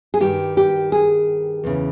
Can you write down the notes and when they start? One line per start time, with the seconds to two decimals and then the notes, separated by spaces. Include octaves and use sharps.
0.14 G#4
0.20 G2 D#3 G4
0.57 G4
0.92 G#4
1.64 E2 C#3 E3